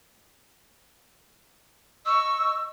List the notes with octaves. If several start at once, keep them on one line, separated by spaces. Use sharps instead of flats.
D#5 C#6 E6